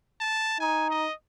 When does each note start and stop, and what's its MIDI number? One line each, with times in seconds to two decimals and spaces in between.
0.21 0.60 81
0.60 1.05 63
0.60 0.88 80
0.90 1.13 75